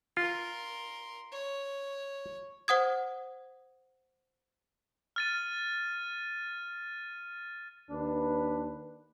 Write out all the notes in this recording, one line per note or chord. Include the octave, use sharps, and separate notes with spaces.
F4 A#4 C6
C#5
C5 F#5 D#6 G#6
F6 A6 D#7
D#2 D4 B4